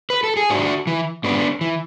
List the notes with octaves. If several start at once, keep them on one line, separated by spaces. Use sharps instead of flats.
B4
A4
G#4
G#2 D4 F#4
E3
G#2 B3 D4
E3